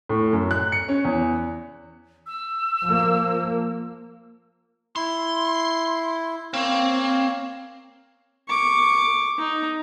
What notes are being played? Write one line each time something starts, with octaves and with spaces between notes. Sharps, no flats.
A2
F#2
F#6
C#7
C#4
E2
E6
F3 A#3
E4 C6
A#3 C4 C#5 F5
C#6 D6
D#4